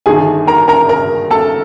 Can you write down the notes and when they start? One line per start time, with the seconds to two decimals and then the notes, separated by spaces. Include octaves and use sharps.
0.06 G1 G2 D#3 G#4 G#5
0.47 A#4 A#5
0.68 A#4 A#5
0.89 A#4 A#5
1.31 A4 A5